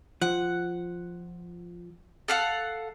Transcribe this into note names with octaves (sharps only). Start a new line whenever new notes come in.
F3 F#5
A4 F5 F#5